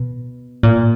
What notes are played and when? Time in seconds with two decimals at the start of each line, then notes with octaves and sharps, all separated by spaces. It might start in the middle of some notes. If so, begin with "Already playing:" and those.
Already playing: B2
0.63 A#2